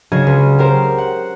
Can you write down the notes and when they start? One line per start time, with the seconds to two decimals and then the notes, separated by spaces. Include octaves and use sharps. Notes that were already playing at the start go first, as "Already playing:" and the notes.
0.12 C#3 F#3 D4 G#4 D#5 G#6
0.27 C#2
0.59 G4 A#4 C5
0.98 F#5